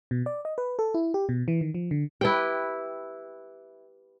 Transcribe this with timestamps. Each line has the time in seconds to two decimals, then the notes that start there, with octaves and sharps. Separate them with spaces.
0.11 B2
0.26 D5
0.45 D#5
0.58 B4
0.79 A4
0.94 E4
1.14 G4
1.29 B2
1.48 E3
1.61 D#3
1.74 F3
1.91 D3
2.21 E4 G4 B4 G5